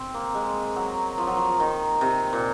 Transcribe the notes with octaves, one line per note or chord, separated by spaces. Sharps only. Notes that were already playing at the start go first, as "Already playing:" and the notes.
Already playing: C4
A#3
G#3
F#3
F3
F#3
F3
D#3
C3
A#2